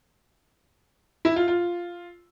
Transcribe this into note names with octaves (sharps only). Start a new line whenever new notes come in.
E4
F4
F4